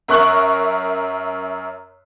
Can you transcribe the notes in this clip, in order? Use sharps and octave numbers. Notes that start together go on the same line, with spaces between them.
F#2 A#4 E5 C#6 F#6 F#7